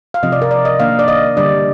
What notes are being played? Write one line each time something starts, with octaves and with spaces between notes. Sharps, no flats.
F5
C3 F3 C4 D#5
D5
A#4
D5
D#5
D#3 A#3 D4 F5
D5
D#5
D3 G3 D4 D5